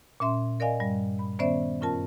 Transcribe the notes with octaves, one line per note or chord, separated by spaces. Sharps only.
A#2 C#4 E5 C6
A#4 D5 D#5 F5 G#5
G2 G3
B5
D#3 B3 C#4 C5 D5 E5
F#2 C#4 F4 A#4 A5